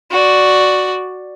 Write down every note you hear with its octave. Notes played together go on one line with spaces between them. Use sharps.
F#4 D5